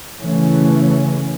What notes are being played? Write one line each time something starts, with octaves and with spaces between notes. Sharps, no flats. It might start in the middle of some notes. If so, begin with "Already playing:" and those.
C#3 E3 A3 C#4